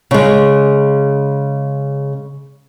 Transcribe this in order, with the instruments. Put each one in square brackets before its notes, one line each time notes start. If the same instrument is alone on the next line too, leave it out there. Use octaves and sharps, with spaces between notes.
[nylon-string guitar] C#3 G#3